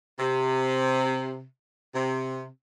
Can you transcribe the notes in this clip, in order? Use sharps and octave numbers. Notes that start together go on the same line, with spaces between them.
C3
C3